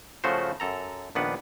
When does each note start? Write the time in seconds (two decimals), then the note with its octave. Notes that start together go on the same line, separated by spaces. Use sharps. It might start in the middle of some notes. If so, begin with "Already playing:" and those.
0.24 C#3 F3 A3 F#4 C5
0.60 F#2 A4 A#5
1.15 A#1 D#3 B3 D4 B4 F#5